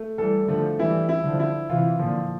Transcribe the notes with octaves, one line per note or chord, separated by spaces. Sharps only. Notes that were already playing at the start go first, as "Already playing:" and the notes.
Already playing: A3
E3 G3 A4
D3 F3 A3
E3 G3 E4
E4
D3 F3
E4
C3 E3 F4
A#2 D3 F3